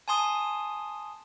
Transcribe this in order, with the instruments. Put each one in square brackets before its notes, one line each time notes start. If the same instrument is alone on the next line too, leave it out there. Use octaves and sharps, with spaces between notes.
[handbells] G#5 A5 C6 D#6